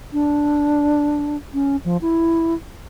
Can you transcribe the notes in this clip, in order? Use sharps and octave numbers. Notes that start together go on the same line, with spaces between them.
D4
C#4
F3
E4